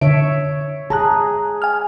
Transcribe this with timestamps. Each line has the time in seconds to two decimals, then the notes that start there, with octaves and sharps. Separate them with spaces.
0.01 D3 C#5 E5 D7
0.90 G#4 A5 A#5 F#6
1.62 G#5 F6